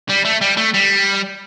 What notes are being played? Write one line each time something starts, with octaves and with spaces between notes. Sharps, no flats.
G3
A3
G3
A3
G3